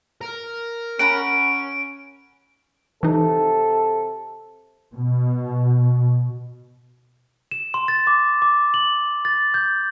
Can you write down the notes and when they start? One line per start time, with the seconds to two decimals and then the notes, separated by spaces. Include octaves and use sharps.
0.21 A#4
0.99 C#4 F#5 A#5 B5 D7
3.03 C3 E3 D#4 A4
4.94 B2
7.51 E7
7.74 C6
7.88 A6
8.07 D6
8.42 D6
8.74 F#7
9.25 A6
9.54 G6